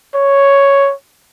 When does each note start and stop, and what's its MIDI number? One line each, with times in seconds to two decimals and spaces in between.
0.15 0.93 73